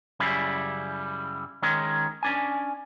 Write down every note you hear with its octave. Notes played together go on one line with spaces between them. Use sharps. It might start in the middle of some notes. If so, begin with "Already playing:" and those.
F#2 C#3 G3 E4
D#3 G#3 C#4
C#4 D4 G#5